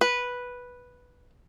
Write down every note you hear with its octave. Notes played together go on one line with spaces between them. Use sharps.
B4